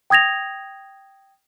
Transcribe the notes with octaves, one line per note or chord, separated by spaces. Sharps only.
G5 D#6 G#6 A#6 F7